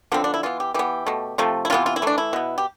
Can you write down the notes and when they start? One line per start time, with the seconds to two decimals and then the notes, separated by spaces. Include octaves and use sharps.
0.12 D3 F3 B3 C4
0.24 D4
0.34 E4
0.43 E3 B3 F4
0.60 G4
0.74 E3 B3 G4
1.07 B2 A3
1.38 C3 F3 A3
1.65 E4
1.70 C3 E3 B3 F4
1.86 F4
1.96 E4
2.02 E3 A3 D4
2.18 E4
2.33 B2 B3
2.58 G4